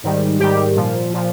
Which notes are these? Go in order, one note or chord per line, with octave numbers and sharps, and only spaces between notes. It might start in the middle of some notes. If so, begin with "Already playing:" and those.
G#2 D#3 G3
G#2 D#3 G3 G4
A#2 F3
A#2 F3